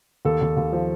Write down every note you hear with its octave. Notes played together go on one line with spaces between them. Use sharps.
D#2 A4
D#2
D#2
F3